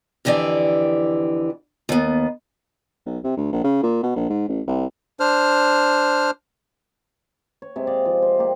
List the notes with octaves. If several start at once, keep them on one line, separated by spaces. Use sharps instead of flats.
F2 D3 E3 G4 D5
D#2 B3
B1
C3
D2
A#1
C#3
A#2
B2
A#1
G#2
A1
C2
D4 C5 F6
C#5
C3 G#3 E5
D5 D#5 F5
F3
C5
A#3 G4